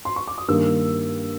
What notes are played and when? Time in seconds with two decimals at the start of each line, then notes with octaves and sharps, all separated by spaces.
0.05 C6
0.16 C#6
0.28 D6
0.38 D#6
0.48 G2 D#3 G3 A#3 E6